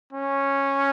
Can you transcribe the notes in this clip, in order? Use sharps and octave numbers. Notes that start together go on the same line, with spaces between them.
C#4